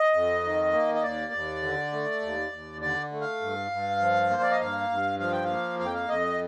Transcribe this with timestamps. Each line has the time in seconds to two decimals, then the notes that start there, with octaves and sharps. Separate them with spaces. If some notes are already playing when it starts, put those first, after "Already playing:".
Already playing: D#5
0.14 F2
0.44 D#3
0.73 A#3
0.95 D#5
1.03 D#2 D5
1.33 D#2
1.63 D3
1.93 A3
2.22 D#2
2.52 D#2
2.82 D3 D5
3.12 A3
3.21 F5
3.41 G2
3.71 G2
4.01 F3
4.30 A#3 C5
4.42 D5
4.51 D#5
4.60 G2 F5
4.90 G2
5.19 F3 F5
5.32 G5
5.44 A#3 F5
5.79 F2 F5
5.86 G5
5.94 F5
6.09 F2 D#5